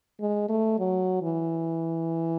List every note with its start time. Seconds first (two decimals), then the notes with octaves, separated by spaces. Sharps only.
0.21 G#3
0.49 A3
0.79 F#3
1.22 E3